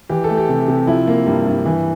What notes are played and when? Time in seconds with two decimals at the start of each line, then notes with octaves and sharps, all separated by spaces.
0.09 E3 G4
0.24 A3 A4
0.37 G4
0.49 C3
0.68 C3
0.87 F3 E4
1.07 A#3
1.26 G2
1.47 G2
1.65 E3